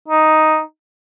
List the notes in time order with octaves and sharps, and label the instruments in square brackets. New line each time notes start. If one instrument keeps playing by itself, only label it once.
[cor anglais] D#4